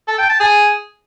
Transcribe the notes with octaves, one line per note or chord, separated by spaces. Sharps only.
A4
G5
A5
G#4